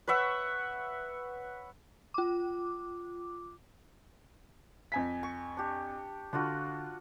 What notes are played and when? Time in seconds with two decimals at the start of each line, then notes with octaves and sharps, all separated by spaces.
0.07 B4 C#5 E5 F#5
2.14 F4 D6
4.92 F2 G#5 B6
5.23 C#6
5.57 D4 G4
6.33 D3 D4 F4 F#4